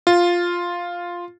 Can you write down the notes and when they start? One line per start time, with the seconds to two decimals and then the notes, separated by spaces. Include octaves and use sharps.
0.07 F4